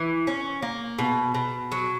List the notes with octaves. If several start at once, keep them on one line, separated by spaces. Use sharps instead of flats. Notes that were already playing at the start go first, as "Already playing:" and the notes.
Already playing: E3
C#4
A#3
B2
B2
F#3